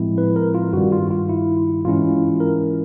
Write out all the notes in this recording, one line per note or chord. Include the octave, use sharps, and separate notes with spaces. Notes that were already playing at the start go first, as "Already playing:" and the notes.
Already playing: A2 F3 G#3 C4 E4
B4
A#4
F4
G2 D#3 G3 F#4
F4
F4
E4
G#2 E3 G#3 C#4 E4 F4
A#4